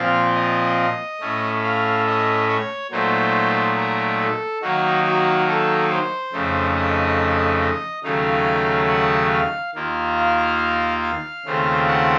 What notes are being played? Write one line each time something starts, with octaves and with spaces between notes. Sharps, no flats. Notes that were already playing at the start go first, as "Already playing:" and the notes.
Already playing: A#2 F3 C4 F4 F5
D#5
A2 A3 C#4
F5
D#5
C#5
A#2 F#3 A3 D#4 C5
A#4
A4
D#3 F#3 A#3 D#4 F#4
F#4
A4
C5
F2 C#3 A3 D#4
D#5
D#5
D#2 C#3 F#3 A3 D#4 F5
F#5
F5
D#2 D#3 A#3 F4
F5
F5
D#2 C#3 A3 C4 F4
F#5